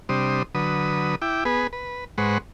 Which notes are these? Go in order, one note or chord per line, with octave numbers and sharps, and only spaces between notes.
C3 G3 D4 C5 D#6
D3 F#3 B4 D#6
E4 G5 D6
B3 G#4 B4
B4
G#2 G#3 B4 C5 F#5 C#6